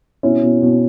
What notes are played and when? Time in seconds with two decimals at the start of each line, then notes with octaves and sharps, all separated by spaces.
0.23 B2 C#4 E4
0.43 B2
0.62 B2